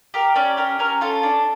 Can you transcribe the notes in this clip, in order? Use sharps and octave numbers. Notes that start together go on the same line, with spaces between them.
G4 A#4
C#4 D5
G4 A#4
C#4 A#4
F4 A4
D4